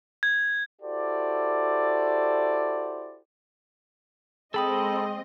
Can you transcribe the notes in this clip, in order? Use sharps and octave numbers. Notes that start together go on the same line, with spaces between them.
G#6
E4 F#4 G4 A4 C5 D5
G#3 C4 G#4 A4 D#5 G5 B5 D#6